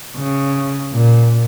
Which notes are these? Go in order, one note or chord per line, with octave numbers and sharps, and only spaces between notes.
C#3
A#2